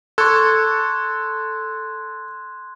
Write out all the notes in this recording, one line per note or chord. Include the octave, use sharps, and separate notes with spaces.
A4 C6 C#6 F#6 G#6